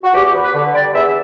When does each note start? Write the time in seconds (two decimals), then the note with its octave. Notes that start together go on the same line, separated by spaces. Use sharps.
0.04 F#4
0.14 E2 G4
0.34 B3
0.44 B4
0.54 D3
0.74 G3 D5
0.94 E2 E5